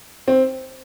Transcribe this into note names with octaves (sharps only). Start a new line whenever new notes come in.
C4